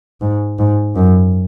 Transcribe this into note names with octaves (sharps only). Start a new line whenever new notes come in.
G#2
G#2
F#2